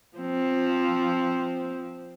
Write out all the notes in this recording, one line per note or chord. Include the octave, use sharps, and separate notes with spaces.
F3 C4